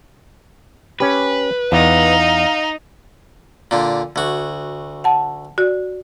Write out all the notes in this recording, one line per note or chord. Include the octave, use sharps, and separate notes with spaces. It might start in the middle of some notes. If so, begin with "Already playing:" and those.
C#4 G4 B4
E2 D#4 F5
A#2 D3
D2 F#4
F#5 A5
F#4 D5